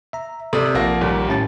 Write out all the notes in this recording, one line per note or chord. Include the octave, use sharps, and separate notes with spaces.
E5 A#5
C3 A4 D5 D#6
A#1 F3 A#3 F#5 A#6
D#2 A#2 G3
A2 C#4 A6